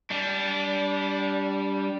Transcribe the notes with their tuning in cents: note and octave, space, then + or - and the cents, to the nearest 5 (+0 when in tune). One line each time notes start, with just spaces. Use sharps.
G3 +0 D4 -25